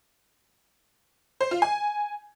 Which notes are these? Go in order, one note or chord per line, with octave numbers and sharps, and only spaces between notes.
C5
F4
G#5